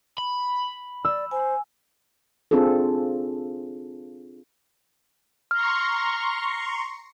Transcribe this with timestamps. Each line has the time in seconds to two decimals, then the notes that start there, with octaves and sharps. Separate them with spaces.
0.18 B5
1.05 D5 E6
1.31 C5 G#5
2.51 C4 D4 F4 G#4 A4
5.51 A#5 C6 C#6 F6